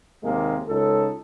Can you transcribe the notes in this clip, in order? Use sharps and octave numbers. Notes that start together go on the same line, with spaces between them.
D#2 C3 G#3 A#3
C#2 D#4 A4